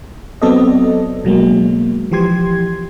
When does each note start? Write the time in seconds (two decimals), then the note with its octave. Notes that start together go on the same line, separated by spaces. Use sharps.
0.42 F#3 B3 C4 A4 D5 D#5
1.25 B2 F#3 G#3 A#3
2.12 E3 F3 G4 C6 G#6